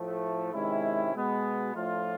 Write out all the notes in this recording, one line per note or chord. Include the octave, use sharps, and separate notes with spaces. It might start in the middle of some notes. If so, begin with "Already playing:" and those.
Already playing: A2 F3 A3
C3 D#3 G#3 C#4 E4
B2 G#3 B3
A2 F3 A3 D4 F4